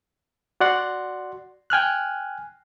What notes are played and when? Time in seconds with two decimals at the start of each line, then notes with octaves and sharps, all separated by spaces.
0.60 F#4 D5 F#5 C6
1.70 G5 G#5 F6 F#6